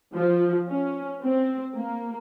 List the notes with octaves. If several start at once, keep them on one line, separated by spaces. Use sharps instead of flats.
F3
C#4
C4
A#3